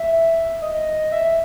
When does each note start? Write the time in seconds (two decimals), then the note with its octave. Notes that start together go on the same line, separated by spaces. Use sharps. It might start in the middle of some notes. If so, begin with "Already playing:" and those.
Already playing: E5
0.62 D#5
1.12 E5